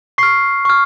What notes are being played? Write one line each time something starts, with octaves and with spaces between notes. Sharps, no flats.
C#6 F6 C7
C#6 F6